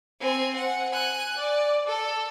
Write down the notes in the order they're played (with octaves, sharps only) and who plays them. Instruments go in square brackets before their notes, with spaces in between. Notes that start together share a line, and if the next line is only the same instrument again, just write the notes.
[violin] C4 G#5
F#5
G#5 F#6
D5
A4